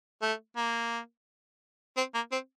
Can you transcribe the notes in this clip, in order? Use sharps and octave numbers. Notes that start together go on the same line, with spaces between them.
A3
A#3
C4
A#3
C4